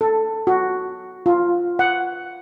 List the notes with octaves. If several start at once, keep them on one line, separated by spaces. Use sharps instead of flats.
A4
F#4
F4
F#5